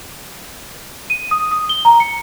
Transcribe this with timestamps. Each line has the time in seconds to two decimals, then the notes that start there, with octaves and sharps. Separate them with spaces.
1.10 D#7
1.31 D#6
1.51 D#6
1.69 G7
1.85 A#5
2.00 C#7